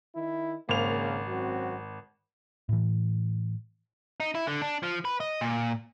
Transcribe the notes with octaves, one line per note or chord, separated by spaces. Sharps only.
D#3 E4
G#1 C#3 A#3 C5 F7
F#2 C4 F#4
A2 E3
D#4
E4
D3
D4
F3
B4
D#5
A#2